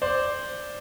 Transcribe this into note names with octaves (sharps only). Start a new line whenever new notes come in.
C5 D5